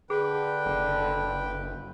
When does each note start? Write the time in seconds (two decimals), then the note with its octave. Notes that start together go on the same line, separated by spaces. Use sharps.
0.10 D3 G#4 B4 G5
0.66 F#1